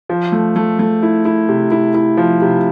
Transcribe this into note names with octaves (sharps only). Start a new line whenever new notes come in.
F3
A3
A3
A3
E4
E4
C3
E4
E4
F3
C3